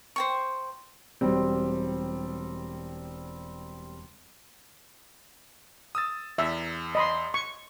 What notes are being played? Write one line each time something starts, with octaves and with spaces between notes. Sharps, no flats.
C5 G5 C#6
E1 G3 C4
D#6 E6 A6
E2 E5 E6
D#5 B5 C6
C#6